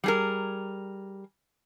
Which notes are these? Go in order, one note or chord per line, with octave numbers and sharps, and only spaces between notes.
G3 G#4 A#4